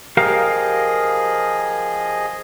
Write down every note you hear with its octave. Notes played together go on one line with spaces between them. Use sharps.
F3 G4 G#4 A#4 D#5 F5